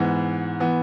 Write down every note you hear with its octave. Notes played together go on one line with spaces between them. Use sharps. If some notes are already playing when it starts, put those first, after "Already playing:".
Already playing: G#2 E3 B3
E3 B3